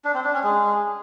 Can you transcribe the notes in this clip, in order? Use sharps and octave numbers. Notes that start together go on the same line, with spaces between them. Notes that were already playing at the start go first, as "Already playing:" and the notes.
D4
C4
D4
C#4
G#3